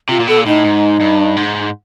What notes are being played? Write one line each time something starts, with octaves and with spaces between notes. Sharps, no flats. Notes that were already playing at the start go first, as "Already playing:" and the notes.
C3 F4
A#2
B2 A4
A#2
A2 D#4
G#2
G2
G#2